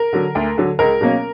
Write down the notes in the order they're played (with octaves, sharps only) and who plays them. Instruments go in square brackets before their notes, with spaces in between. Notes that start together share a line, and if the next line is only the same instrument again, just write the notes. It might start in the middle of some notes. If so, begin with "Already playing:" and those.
Already playing: [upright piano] A#4
D3 F#3
D2
D3 F#3
C#2 A#4
B2 F#3 A#3 C#4